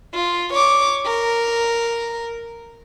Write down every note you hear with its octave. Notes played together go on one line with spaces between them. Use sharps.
F4
C#5 D6
A#4